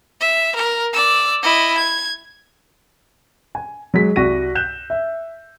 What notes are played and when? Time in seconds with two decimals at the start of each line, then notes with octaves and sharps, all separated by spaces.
0.20 E5
0.55 A#4
0.93 D5 E6
1.43 E4 D#5
1.77 G#6
3.55 G#5
3.94 F#3 G#3 B6
4.16 C2 F#4 D5 A#6 D#7
4.55 F#6 G6 E7
4.90 E5